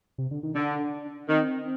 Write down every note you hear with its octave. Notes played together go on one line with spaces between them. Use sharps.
C3
D3
D#3
D3 D4
D#3 C4